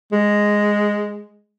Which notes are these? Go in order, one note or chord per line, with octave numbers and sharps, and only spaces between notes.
G#3